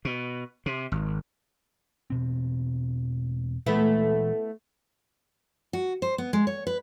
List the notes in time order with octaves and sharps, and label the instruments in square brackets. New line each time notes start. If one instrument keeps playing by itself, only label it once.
[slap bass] B2
C3
G#1
[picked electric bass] E1 B2 C4
[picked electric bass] A#2 E3 G#3 [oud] A3 B3 E4
[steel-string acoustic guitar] F#4
C5
B3
G#3
C#5
B4